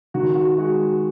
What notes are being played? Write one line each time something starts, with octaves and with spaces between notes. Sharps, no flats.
D#3 F#4
F#4
G#3 F#4